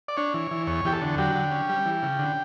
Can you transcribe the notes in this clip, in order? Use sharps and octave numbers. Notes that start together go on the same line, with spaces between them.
D5
D4 C#5
E3
E3
E2 C#5
E2 G4
A4
D3
F#3 G4
D3
C#4
G3
E3
C#3
D3